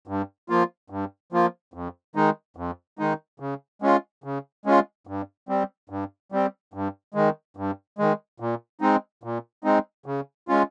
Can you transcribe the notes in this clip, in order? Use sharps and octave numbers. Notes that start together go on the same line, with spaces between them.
G2
F3 A#3 F4
G2
F3 A#3 F4
F2
D#3 G#3 D#4
F2
D#3 G#3 D#4
C#3
G#3 C#4 F4
C#3
G#3 C#4 F4
G2
G3 C4
G2
G3 C4
G2
D#3 G#3
G2
D#3 G#3
A#2
G#3 C4 D#4
A#2
G#3 C4 D#4
C#3
G#3 C#4 F4